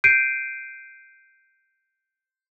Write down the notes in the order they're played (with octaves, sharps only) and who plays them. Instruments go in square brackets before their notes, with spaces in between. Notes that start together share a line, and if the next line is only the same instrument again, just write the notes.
[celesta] G6 C7 D7 D#7